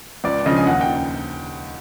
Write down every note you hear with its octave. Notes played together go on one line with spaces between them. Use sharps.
C#2 D5
C#3 F3 D#5
G#5
D#2 F#5
G5